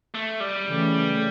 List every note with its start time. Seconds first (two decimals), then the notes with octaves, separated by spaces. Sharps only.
0.14 A3
0.40 G3
0.66 C#3 E3 A3